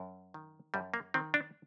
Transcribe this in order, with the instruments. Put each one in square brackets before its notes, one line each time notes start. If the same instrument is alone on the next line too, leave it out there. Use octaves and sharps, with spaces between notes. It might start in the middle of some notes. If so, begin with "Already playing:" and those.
Already playing: [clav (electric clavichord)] F#2
D#3
F#2 G3
A#3
D#3 C4
D4